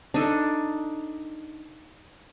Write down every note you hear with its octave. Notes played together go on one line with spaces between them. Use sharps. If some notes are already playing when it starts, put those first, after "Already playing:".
D4 D#4 A4